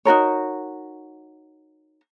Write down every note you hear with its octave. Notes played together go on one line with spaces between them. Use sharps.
D#4 F#4 A#4 C#5